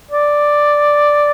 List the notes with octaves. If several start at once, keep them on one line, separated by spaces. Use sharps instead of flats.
D5